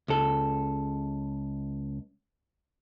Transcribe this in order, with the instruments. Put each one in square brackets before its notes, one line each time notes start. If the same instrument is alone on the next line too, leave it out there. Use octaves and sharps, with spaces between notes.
[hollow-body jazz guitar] C#2 A4